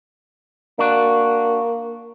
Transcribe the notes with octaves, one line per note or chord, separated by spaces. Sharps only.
A#3 D4 F#4